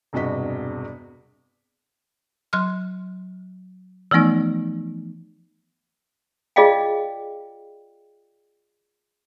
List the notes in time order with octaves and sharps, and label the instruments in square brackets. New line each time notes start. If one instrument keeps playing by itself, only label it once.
[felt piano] E1 G2 C3 F#4 D#5 B6
[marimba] F#3 C6 F6
E3 F3 A3 B3 D#4
[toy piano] F4 G#4 D5 D#5 F5 G5